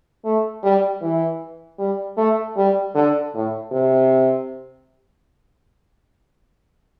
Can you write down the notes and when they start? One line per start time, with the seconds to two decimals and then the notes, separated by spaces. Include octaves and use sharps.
0.25 A3
0.63 G3
1.01 E3
1.79 G3
2.17 A3
2.57 G3
2.95 D3
3.34 A2
3.72 C3